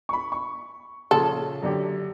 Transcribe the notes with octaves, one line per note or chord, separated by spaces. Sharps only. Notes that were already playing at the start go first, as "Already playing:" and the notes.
B5 C#6
C#6
A#2 C#3 F3 A4
F#2 D3 G4